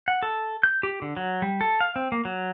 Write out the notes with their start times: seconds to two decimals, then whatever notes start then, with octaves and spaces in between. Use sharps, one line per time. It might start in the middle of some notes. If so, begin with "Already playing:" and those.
0.08 F#5
0.23 A4
0.63 G6
0.83 G4
1.02 D3
1.17 F#3
1.42 G3
1.61 A4
1.81 F5
1.96 C4
2.12 A#3
2.25 F#3